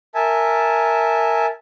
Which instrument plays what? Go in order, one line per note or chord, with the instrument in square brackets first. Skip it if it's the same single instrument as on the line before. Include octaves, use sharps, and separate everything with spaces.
[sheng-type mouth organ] A#4 E5 G#5 A5